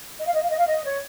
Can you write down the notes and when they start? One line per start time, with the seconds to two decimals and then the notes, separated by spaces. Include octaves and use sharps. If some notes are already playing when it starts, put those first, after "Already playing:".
0.19 D#5
0.26 F5
0.34 D#5
0.43 F5
0.50 D#5
0.58 F5
0.67 D#5
0.85 C#5